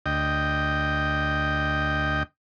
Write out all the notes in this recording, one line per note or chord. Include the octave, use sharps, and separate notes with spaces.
D2 D#5 G5